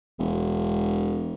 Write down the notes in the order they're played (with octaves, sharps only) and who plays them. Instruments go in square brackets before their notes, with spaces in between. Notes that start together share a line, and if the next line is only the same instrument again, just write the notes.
[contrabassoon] E1